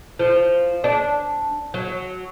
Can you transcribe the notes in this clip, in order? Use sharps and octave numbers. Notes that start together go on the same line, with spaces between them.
F3
D4
F#3